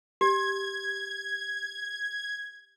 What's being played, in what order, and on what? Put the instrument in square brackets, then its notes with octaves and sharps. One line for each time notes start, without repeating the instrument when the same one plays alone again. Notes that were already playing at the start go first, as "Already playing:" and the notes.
[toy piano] G4 [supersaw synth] G#6